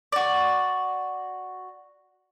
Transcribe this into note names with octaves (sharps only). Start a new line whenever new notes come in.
F#4 D5